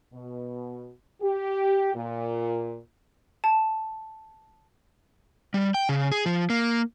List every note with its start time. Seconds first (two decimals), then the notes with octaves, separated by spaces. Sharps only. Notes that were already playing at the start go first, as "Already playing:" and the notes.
0.13 B2
1.22 G4
1.95 A#2
3.44 A5
5.54 G3
5.74 G5
5.89 C#3
6.12 G#4
6.26 F3
6.50 A#3